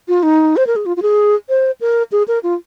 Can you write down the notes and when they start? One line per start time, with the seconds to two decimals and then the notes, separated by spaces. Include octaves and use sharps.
0.08 F4
0.23 D#4
0.57 C5
0.67 A#4
0.76 G#4
0.86 F4
0.97 F4
1.02 G#4
1.49 C5
1.81 A#4
2.12 G#4
2.28 A#4
2.43 F4